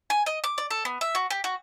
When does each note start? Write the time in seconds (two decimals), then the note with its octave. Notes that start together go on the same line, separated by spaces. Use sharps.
0.10 G#5
0.26 D#5
0.44 D6
0.58 D5
0.71 A4
0.85 B3
1.01 E5
1.15 F#4
1.30 G4
1.44 F#4